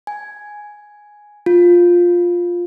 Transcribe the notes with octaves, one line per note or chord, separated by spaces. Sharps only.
G#5
F4